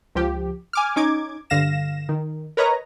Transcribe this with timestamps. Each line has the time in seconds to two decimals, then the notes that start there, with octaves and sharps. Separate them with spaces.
0.15 C#2 F3 G4
0.73 G#5 D6 F6
0.96 C#4 D#4 D6 G#6
1.50 G2 D3 F5 A#6 E7
2.09 D#3
2.57 A#4 B4 C#5 D#5 A#5